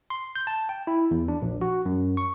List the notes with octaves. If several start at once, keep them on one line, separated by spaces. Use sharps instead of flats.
C6
G6
A5
G5
E4
E2
D4
A#1
F#4
F#2
C#6